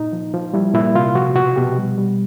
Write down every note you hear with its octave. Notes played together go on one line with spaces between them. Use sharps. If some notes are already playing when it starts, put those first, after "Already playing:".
Already playing: A#2 D#4
F3
F3
G3 E4
A#2 E4
C3 F4
F3 F#4
B2 F#4
B2 G4
G3
G3